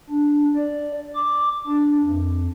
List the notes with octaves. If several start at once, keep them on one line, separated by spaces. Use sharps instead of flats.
D4
D5
D6
D4
F2